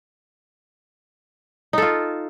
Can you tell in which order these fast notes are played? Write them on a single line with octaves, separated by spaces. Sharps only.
D#4 A4 F4